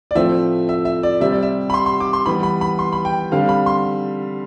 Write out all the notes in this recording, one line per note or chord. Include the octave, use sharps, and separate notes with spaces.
D5
A2 F3 A3 C4 E5
E5
E5
D5
C3 G3 C4 E5
D5
E5
B5
C6
C6
D6
C6
E3 G3 B3 B5
B5
B5
C6
B5
G5
D3 G3 C4 F5
B5
C6